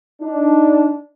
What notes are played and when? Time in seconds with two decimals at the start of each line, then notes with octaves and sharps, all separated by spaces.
0.22 D4 D#4